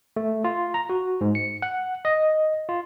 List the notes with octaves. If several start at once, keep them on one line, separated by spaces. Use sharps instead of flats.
A3
F4
A#5
F#4
G#2
C#7
F#5
D#5
F4